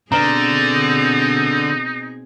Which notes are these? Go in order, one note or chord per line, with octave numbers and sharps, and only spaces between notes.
B2 D3 C4 D#4 G#4 B4 A#5